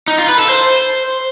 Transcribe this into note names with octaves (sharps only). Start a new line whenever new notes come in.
D#4
F4
B4
A4
C5